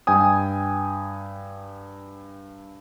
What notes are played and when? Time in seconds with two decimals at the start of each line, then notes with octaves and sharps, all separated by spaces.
0.07 G2 G5 G#5 D#6